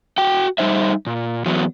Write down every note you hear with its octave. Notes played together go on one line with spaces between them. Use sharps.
F#4 G5
G3 G#3 D#4 C5 E5
A#2
E2 F#3 B3